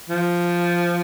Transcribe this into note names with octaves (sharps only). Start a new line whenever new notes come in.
F3